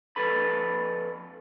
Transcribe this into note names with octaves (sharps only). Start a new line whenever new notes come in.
F2 A4 B4 B5